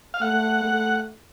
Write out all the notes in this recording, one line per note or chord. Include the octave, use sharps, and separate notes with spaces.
F5
A3 F#5
A3